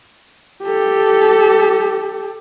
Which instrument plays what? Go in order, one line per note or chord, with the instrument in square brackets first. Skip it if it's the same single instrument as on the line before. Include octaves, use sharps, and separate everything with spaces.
[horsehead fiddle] G4 A4